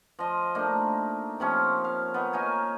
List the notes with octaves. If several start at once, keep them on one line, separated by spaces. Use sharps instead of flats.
F3 D#5
A3 A#3 D4 D#4
C3 F3 C#4
F5
B3 D#4
A#3 D#4 C#5 G#5